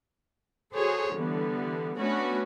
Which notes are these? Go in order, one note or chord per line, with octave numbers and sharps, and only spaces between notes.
F#4 G#4 A4 C5 C#5
D3 E3 G3 B3
A3 B3 C#4 D4 F#4 B4